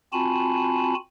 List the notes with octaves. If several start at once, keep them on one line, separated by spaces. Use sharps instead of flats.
C4 F4 F#4 G#5 A5 B5